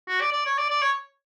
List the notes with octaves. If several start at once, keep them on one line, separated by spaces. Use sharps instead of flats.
F#4
D5
D5
C#5
D5
D5
C#5